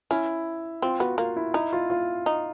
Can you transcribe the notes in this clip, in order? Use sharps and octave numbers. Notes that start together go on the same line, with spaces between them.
C#4 E4
C4 F4
B3 F#4
A#3 F4
E4
D#4 E4
F4
F4
D#4